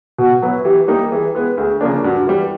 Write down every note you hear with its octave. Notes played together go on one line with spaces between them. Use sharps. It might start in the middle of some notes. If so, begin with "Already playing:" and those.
B2 F#4
F#3 B3 E4
E3 G4
G3 A#3 D#4 G4
E3 G#4
G#3 B3
D2 G#4
C#3 F3 A#3 D4
G2 F#4
E3 G3